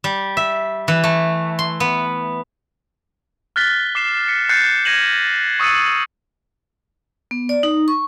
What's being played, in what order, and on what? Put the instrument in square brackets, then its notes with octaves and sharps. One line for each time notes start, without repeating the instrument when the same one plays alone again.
[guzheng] G3
E5
E3
A3
C6
B3
[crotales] F6 F#6 A6 B6 G7
D6 C7 E7
B6 C#7
F#6 G6 A6 C7 C#7
G#6 A#6 D#7 E7 F#7
C#6 D#6 E6 A6 C#7 D#7
[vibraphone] B3
D5
D#4
C#6